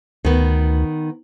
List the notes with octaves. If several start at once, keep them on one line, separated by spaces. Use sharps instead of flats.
D2 D#3 B3